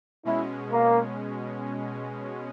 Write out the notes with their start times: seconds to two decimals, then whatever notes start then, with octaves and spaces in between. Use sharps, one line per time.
0.25 B2 G#3 C#4 E4
0.70 A#3